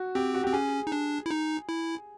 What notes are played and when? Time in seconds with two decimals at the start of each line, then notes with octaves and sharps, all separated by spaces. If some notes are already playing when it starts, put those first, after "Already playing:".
Already playing: F#4
0.15 C4 G4
0.34 F#4
0.44 C4 G4
0.53 C#4 G#4
0.87 D#4
0.92 D4
1.26 E4
1.31 D#4
1.69 E4